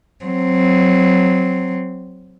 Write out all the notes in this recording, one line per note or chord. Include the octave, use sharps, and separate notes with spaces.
F#3 C4